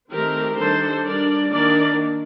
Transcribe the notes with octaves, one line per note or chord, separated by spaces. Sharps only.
D#3 A3 C4 G4 A#4
D#3 G3 D4 A4 C5
G3 D4 A#4 D5
D#3 A#3 D4 A#4 D5